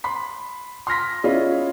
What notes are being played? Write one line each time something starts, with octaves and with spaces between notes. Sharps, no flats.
B5 C6 B6
C6 F6 A#6 B6
C#4 E4 F4 G#4 D5 D#5